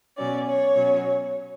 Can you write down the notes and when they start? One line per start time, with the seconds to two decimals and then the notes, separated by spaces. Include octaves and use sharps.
0.17 B2 F#3 C#4 D5
0.46 C#5
0.75 B2 F#3 C#4